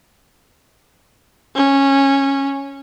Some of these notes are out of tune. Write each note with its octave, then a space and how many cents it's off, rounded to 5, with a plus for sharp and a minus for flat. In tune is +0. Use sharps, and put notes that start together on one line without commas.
C#4 -10